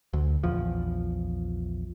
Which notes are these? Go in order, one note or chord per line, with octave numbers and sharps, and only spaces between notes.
D2
A#1 E2 F3